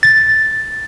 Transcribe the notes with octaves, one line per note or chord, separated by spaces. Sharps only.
A6